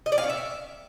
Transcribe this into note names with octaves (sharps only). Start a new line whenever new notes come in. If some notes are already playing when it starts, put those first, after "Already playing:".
D#5
D5
F5
C#4
E5